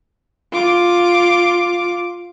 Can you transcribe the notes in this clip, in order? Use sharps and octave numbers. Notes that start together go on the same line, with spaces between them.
F4 D6